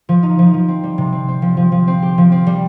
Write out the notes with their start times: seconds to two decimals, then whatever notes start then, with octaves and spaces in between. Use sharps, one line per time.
0.09 F3
0.23 D#4
0.39 F3
0.54 F3
0.68 C4
0.84 G3
0.98 C3
1.12 C4
1.28 C4
1.42 F3
1.57 F3
1.72 F3
1.87 C4
2.02 G4
2.18 F3
2.32 C4
2.47 G3